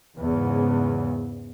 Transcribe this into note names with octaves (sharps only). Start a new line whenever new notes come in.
E2 G#2 C#3